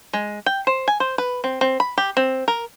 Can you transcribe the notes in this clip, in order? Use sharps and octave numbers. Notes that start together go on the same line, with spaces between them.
G#3
G5
C5
G#5
C5
B4
C4
C4
B5
G4
C4
A#4